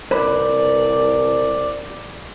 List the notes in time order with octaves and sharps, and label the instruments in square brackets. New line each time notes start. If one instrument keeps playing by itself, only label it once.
[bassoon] C2 [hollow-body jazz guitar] B4 C5 B5 [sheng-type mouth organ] D5